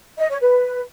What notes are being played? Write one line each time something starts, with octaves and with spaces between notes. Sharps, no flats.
D#5
C#5
B4